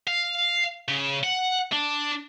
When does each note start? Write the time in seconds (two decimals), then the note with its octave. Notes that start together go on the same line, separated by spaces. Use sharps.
0.07 F5
0.89 C#3
1.24 F#5
1.72 D4